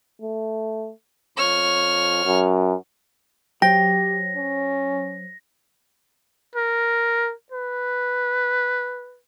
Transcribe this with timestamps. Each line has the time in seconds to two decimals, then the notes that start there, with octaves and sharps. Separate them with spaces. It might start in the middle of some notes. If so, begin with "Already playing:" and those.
0.22 A3
1.37 F2 C#5 F6
2.25 F#2
3.62 F#3 G4 C5 C#5 G5 A#6
4.36 C#4
6.56 A#4
7.52 B4